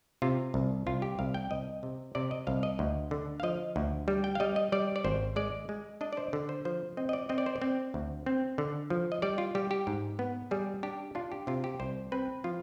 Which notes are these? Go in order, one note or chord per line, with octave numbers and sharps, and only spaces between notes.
C3 F4
C2
C2 F4
G4
C2 F5
G5
C2 D#5
C3
C3 D5
D#5
C2 F5
D#5
D2
D3
F5
F3 D#5
D2
G3
G5
F5
G3 D#5
D#5
G3 D5
D5
G#1 C5
G#3 D5
G#3
D4 D#5
D5
C5
D3
C5
F3 C5
C4 D#5
D#5
D5
C4 D#5
D5
C5
D5
C4
D2
C4
D3
F3
D#5
G3 D5
F4
G3 G4
G4
G#2
B3
G3 G#4
D4 G4
D4 F4
G4
C3 F4
G4
C2 C5
C4 B4
F3 F4